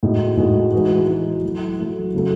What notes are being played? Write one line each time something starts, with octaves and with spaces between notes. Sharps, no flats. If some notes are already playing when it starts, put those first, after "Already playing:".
A2 G#3 D#4 F#4
A2 G#3 D#4 F#4
E3 G#3 D#4 F#4
E3 G#3 D#4 F#4
F#3 A3 E4
F#3 A3 E4
C#3 F#3 A3